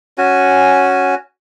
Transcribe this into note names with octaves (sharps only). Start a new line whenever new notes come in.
C#4 F#4 G#5